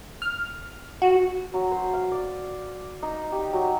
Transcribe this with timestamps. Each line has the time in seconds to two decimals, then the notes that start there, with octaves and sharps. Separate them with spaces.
0.22 F6
1.02 F#4
1.54 F#3
1.72 C5
1.93 F5
2.12 D5
3.03 D#4
3.32 G4
3.53 F#3